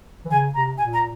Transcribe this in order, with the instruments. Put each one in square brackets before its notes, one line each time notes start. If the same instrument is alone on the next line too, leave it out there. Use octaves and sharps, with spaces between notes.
[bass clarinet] E3
[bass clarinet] C#3 [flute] G#5
[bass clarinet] C3 [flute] A#5
[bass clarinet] A#2 [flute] G#5
[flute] A#5